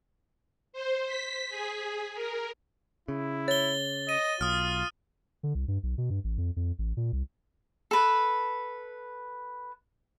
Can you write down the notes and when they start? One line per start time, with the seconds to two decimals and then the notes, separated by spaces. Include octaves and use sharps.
0.73 C5
1.06 B6
1.49 G#4
2.14 A#4
3.08 C#3 E4
3.48 C#5 A6 G7
4.09 D#5 D#7
4.41 B1 F4 D#6 F6
5.43 D3
5.55 C2
5.68 G2
5.83 B1
5.98 B2
6.10 G2
6.24 A1
6.38 F2
6.56 F2
6.79 A1
6.97 A#2
7.13 C2
7.91 A4 B4